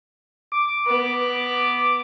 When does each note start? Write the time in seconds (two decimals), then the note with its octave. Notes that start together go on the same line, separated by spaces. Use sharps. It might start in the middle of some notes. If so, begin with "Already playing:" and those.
0.52 D6
0.87 B3